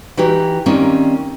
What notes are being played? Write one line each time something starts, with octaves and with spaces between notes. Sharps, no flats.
E3 D#4 F#4 G4
D#3 G3 A#3 C4 C#4